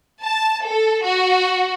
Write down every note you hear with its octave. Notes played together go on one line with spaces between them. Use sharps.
A5
A4
F#4